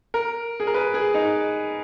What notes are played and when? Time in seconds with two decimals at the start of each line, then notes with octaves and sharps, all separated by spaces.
0.14 A#4
0.60 G#4
0.67 A#4
0.74 B4
0.94 G#4
1.14 D#4